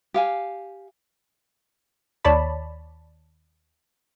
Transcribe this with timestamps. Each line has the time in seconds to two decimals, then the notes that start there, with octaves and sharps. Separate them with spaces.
0.14 G4 F5 G#5
2.25 D#2 C#5 D5 A5 B5